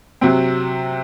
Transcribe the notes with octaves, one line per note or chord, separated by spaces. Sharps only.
C3 F#3 C4